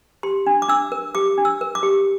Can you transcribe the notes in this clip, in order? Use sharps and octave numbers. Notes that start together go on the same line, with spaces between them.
G4 C6
D4
D6
D4 E6
A#4
G4 D6
D4
E6
A#4
D6
G4